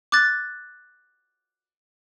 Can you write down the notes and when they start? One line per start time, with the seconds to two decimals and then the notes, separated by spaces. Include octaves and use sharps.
0.12 D6 F#6 A6